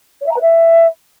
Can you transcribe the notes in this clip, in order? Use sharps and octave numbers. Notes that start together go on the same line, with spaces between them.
C#5
E5
A#5
B4
E5